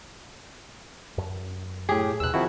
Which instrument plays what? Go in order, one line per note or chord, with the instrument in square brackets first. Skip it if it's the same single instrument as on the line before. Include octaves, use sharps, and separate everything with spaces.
[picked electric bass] F#2
[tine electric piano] A2 G4 [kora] G#4
[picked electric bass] D#2 B2 [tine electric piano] E6 F#6
[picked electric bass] D#3 C4 [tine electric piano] F3 E4 F#4